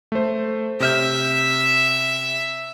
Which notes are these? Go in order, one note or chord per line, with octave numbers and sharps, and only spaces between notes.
A3 C5
C3 E5 F6 G6